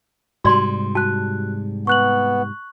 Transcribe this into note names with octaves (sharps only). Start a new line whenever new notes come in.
G#2 C3 G3 F#4 D5 C6
F#4 A5 F#6
B3 C#6 F#6 F#7